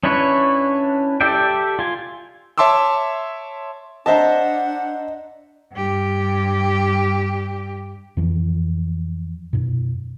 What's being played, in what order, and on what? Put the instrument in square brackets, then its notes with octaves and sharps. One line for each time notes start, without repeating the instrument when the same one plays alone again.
[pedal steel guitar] C#4 D4 E4 B4 C#5
G4 A4 D5 E5 G5
F4 G#5
[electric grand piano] C#5 E5 A5 C6 D6 E6
[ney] D4 [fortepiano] C5 E5 A5 [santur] D#5 A#5 [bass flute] F#5
[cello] G2 G4
[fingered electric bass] F2 E3 F3
F#2 B2